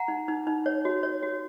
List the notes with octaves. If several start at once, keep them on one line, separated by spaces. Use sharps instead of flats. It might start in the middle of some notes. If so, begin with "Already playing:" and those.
Already playing: F#5 A#5
D#4
D#4
D#4
C#5
F#4
C#5
F#4